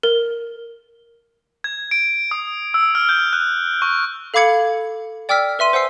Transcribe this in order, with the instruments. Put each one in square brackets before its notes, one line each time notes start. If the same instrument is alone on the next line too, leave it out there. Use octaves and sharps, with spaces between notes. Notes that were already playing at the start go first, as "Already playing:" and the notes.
[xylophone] A#4
[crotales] G#6
D7
D#6
E6
F6
G6
F#6
C#6
[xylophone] A4 F5 B5 D6 G#6 C#7
D5 G5 D6 E6 F6 B6
B4 E5 C6 D#7
C5 F#5 G#5 E6 C7